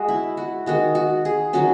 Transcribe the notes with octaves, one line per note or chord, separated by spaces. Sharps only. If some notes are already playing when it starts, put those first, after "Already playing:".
Already playing: G#3 F#4
E4
F#4
D#3 G#3 D#4 F#4
F#4
G#4
D#3 F#3 C#4 F#4